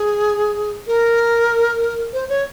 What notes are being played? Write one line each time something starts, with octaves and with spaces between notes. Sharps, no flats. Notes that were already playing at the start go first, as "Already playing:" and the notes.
Already playing: G#4
A#4
C5
C#5